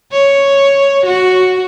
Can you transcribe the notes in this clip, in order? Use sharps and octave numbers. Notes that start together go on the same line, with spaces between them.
C#5
F#4